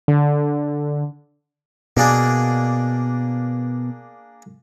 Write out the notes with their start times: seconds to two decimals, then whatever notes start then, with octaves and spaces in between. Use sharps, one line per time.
0.08 D3
1.97 B2 A#3 D4 G#4